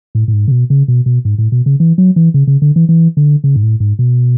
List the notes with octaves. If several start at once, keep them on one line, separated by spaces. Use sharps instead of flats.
A2
A2
G#2
C#3
B2
C#3
B2
B2
G#2
A2
B2
C#3
E3
F#3
E3
C#3
C#3
D3
E3
E3
D3
C#3
G#2
A2
G#2
B2